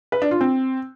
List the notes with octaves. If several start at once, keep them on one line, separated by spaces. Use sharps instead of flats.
B4
D4
F4
C4